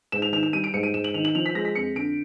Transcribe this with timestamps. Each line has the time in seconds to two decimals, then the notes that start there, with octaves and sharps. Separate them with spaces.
0.12 G#2 E7
0.22 F7
0.32 D#3 F7
0.43 F7
0.53 G3 D#7
0.64 D7
0.74 G#2 C#7
0.83 D#7
0.94 G#2 E7
1.04 F#7
1.14 D#3 F7
1.25 F#7
1.35 F3 F7
1.46 B6
1.55 G#3 A#6
1.65 B6
1.75 F2 C#7
1.95 D3 D7